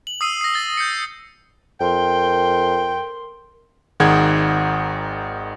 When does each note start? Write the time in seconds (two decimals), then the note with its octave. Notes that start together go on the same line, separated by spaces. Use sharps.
0.07 F#7
0.21 D#6 E6 C7 D#7
0.41 A#6 C7
0.54 A6 G7
0.77 G6 C7 C#7
1.81 F2 A#4 G5 C6
4.00 G#1 D#3 G#4 F#5 G#6